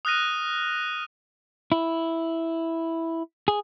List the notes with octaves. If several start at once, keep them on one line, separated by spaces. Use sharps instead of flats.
D#6 F6 F#6 A#6 D#7
E4
G#4